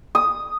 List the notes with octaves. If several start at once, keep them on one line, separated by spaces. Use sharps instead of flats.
D#6